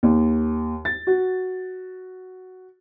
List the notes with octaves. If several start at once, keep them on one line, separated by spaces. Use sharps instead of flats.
D#2
A6
F#4